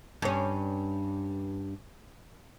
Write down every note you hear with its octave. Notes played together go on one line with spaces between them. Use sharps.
G2 C#4